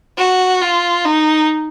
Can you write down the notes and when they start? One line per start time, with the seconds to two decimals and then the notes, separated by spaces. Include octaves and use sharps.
0.18 F#4
0.62 F4
1.05 D#4